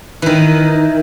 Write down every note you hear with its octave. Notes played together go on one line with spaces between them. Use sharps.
D#3 E3